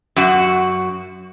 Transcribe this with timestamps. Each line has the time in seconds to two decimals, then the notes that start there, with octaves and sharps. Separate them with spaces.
0.16 F#2 F#4